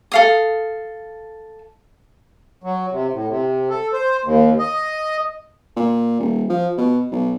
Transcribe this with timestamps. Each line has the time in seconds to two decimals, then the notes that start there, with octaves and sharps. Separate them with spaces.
0.12 A4 F5 D#6
2.64 F#3
2.91 C3
3.13 A2
3.29 C3
3.70 A4
3.93 C5
4.25 D#2
4.59 D#5
5.76 A#2
6.20 D#1
6.50 F3
6.77 B2
7.12 B1